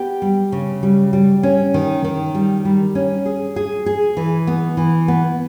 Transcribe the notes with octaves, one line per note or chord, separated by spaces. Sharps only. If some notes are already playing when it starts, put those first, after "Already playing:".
Already playing: B3 G4
G3
C#3
G3
G3
C#4
D#3
D#3
G3
G3
C#4
G#4
G#4
G#4
E3
B3
E3
B3